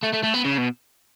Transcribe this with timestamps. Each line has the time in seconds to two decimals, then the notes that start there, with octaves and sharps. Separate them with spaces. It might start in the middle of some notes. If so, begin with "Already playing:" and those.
0.03 A3
0.13 A3
0.23 A3
0.34 B3
0.45 C#3
0.58 B2